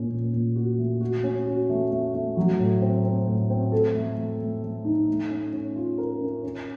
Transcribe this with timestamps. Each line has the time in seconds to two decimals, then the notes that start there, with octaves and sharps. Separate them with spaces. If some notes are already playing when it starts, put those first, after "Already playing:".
Already playing: A#2 C#4
0.11 A#2
0.33 A#2
0.56 F#4
0.78 A3
1.01 F#4
1.24 C#4
1.46 F#4
1.69 A3
1.91 A3
2.14 A3
2.37 F#3
2.59 A2
2.82 C4
3.04 C4
3.28 A2
3.50 C4
3.72 A4
3.95 A3
4.17 A3
4.40 A3
4.62 A3
4.85 D#4
5.08 A3
5.30 C#4
5.53 C#4
5.76 F4
5.98 A#4
6.21 C#4
6.43 C#4